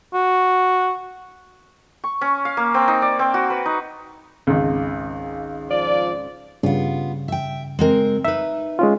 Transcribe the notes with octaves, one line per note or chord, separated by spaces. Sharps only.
F#4
C#6
C#4
F5
A#3
C4
D#4
D5
C4
F#4
B4
D#4
G#1 C#2
F3 F4 D5
G2 C#3 B3 F4
E5 G5
G#3 C4 A#4
D#4 B4 E5
G#3 C#4 F4